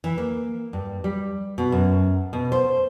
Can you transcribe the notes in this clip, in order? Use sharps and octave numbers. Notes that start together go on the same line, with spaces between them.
E3
A#3
G2
G3
B2
F#2
B2
C5